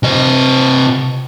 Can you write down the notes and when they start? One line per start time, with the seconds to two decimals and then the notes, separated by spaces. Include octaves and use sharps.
0.03 C3 D#5